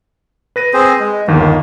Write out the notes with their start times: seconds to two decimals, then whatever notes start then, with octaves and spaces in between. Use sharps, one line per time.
0.56 B4 A#6 D#7
0.73 C4 G#4 C5
1.00 G#3
1.27 G1 D#2 D#3 A#3